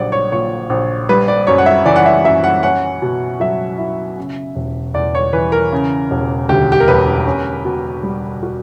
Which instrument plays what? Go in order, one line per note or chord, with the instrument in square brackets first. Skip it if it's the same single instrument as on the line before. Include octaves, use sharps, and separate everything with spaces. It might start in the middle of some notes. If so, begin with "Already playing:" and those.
Already playing: [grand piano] A#1 F#3 [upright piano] D5 F#5
[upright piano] C#5
[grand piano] A#2 [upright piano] C#5
[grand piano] A#1
[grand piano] G3 [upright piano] B4
[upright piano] D5
[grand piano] F#2 [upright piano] C#5
[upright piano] F#5
E5
[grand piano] E3 [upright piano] D5
[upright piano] F#5
E5
[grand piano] F#2 [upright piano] E5
[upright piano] F#5
[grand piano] C#4 [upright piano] F#5
[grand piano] B2
[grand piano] F#3 [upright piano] E5
[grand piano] E4
C#3
E1
[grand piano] E2 [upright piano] D5
[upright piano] C#5
[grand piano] E3 [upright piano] B4
[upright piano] A#4
[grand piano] C#3
E1
[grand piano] D2 [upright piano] G4
[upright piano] G4
A#4
[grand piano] E1 [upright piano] B4
[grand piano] C#4
B2
G3
F#4